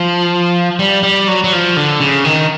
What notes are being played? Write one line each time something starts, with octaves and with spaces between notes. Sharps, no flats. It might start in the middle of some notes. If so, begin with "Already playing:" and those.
Already playing: F3
G3
G3
F#3
F#3
F3
D3
C#3
D#3